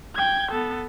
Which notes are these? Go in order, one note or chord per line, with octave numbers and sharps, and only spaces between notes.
G5 G#6
B3 A4